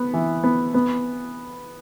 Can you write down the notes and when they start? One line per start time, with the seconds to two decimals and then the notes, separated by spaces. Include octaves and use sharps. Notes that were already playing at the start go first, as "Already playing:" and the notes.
Already playing: B3
0.14 E3
0.44 B3
0.74 B3